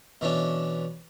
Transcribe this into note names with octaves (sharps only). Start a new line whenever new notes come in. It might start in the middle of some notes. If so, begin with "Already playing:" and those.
B2 E3 C#4 D4